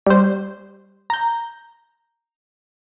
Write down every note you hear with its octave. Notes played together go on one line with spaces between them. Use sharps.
G3 C5
A#5 G6